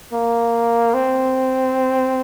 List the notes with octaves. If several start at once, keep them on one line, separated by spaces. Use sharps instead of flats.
A#3
C4